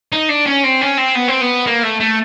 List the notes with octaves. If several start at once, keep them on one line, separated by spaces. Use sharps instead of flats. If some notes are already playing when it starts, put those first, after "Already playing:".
D#4
D4
C#4
C4
C#4
C4
B3
C4
B3
A#3
A3
A3